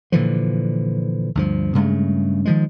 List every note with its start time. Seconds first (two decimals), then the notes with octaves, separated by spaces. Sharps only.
0.12 A#2 D3 E3 F3
1.35 D2 G2 F3
1.75 G2 C#3 G#3 A3
2.45 D#3 F3 G#3